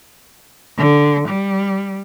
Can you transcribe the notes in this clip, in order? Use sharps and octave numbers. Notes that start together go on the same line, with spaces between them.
D3
G3